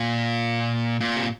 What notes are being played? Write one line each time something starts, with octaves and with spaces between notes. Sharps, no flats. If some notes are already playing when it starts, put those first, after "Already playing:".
Already playing: A#2
A#2
C3